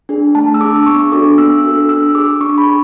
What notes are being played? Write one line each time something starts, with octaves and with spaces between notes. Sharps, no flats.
D4 G#4
A3 A5
E6
D4 G#4 D6
B3 C#6
D4 F#4 A4 D6
B3 E6
D4 F#4 A4
D4 E6
G#4 D6
D4 C#6
B5
G#4